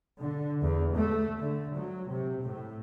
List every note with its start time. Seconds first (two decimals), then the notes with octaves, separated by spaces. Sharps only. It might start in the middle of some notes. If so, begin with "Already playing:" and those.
0.19 D3
0.61 E2
0.93 A3
1.40 D3
1.76 F#3
2.12 C3
2.43 A2